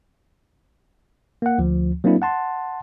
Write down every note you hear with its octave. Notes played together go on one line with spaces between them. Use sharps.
A#3 F#5
D2 F3
F#3 A#3 C4 D4 E4
F#5 A5 C6